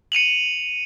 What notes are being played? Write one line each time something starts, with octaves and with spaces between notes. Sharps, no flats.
C#7 D#7 F7 F#7